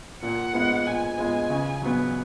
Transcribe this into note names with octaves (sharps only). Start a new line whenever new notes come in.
A#2 F#5
G#3 B3 F4
A#2 G#5
G#3 B3 F4
C#3
F#3 B3